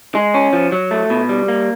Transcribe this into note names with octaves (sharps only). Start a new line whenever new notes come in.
G#3
C#4
F3
F#3
A3
B2
G3
A#3